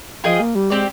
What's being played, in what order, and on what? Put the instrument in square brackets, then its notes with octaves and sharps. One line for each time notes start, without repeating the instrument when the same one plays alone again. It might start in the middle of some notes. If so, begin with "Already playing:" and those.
[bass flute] F3 [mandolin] F4 G#4 D#5 G5
[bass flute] A#3
G3
[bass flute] G#3 [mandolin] C4 G4 D5